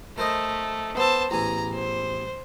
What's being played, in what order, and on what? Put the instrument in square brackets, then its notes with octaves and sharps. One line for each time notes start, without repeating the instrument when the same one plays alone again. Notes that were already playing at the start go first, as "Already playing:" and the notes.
[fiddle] A3 [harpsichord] A#4 C5 D#5
[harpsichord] B3 A4 [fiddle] C5 A5
[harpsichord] A1 E2 G#5 [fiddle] A#5
[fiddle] C5